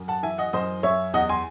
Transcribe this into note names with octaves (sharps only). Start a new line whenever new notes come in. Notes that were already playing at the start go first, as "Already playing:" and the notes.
Already playing: F#2
F#5 A5
E3 E5 G#5
D#5 F#5
F#2 C5 D#5
F#2 C#5 E5
E2 D#5 F#5
G#5 C6